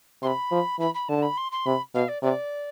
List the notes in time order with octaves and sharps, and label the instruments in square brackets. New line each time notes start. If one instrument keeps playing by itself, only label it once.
[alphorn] C3 [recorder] C6
[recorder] B5
[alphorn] F3
[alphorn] E3 [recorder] B5
[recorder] B5
[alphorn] D3 [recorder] A5
[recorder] B5
C6
C6
[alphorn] C3 [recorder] B5
[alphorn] B2 [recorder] F5
[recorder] D5
[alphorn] C3 [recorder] D5